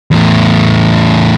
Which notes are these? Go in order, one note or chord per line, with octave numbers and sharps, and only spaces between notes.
E2 A2